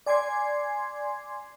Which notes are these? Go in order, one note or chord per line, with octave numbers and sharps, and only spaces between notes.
D5 G#5 C6 D6 G#6 C7